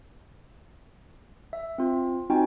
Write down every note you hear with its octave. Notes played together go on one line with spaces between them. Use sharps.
E5
C4 F4
C4 D#4 F4 F#4 G5 G#5